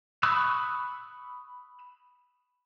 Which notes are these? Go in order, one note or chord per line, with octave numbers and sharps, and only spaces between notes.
B5 C#6 D#6 E6 F#6